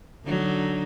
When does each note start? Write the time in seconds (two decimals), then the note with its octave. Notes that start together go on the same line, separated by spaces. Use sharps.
0.25 D3 F#3 D#4